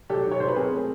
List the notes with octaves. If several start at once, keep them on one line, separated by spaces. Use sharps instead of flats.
F#3 G4 A4
D#3
C#5
F#3 C5
B4
C4 G#4 A#4
A3